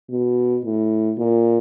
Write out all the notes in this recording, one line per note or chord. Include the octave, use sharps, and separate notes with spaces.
B2
A2
A#2